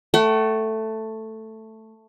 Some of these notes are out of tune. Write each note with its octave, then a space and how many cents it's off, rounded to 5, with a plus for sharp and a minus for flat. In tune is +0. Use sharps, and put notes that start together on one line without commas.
A3 +5 F#5 +45